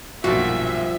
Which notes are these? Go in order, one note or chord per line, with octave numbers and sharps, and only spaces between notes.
B1 G2 A#2 F3 F#4 E5